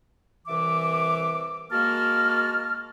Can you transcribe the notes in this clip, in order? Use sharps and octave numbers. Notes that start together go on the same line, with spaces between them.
C2 E3 E5 D6
G#3 A#3 F#4 A#4 A5 F6